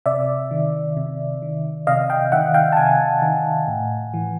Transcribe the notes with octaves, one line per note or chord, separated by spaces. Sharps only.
C3 D5 E5
D#3
C3
D#3
C3 D#5 F5
F5 G5
D#3 E5 F#5
F5 G5
A5
C3 F#5 G#5
D#3
A2
E3